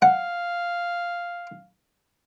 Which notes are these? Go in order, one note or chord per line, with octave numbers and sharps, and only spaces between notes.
F5 F#5